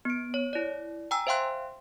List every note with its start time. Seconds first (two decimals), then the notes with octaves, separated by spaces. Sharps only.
0.05 B3 D7
0.34 C#5
0.53 E4 D5
1.11 G5 G#5 A#5 E6
1.27 C5 E5 F5 G5 C6 F#6